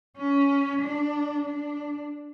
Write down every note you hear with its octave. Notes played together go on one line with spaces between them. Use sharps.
C#4
D4
D4